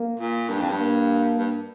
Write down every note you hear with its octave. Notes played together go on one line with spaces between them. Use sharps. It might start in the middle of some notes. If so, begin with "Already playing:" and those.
Already playing: A#3
A#2
G2
F2
G2
A#3
G2